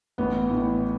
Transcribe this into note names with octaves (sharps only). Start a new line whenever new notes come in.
A1 B3
A2 E3